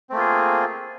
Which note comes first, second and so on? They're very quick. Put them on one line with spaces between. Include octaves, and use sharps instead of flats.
C4 A3 A#3 F4 G#4